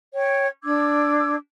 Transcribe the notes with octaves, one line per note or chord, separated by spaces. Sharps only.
C#5 G5
D4 D6 E6 G#6